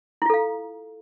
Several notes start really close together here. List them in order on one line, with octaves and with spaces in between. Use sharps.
E4 F4 A4 F5